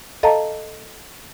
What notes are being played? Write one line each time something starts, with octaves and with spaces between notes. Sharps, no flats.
A4 D#5 F5 A5 A#5